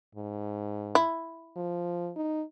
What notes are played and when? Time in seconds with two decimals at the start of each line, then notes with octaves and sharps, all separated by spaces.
0.15 G#2
0.95 E4
1.56 F3
2.16 D#4